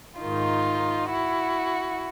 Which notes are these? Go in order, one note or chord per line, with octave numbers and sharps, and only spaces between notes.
G#2 D#3 D#4 F4
E4 F#4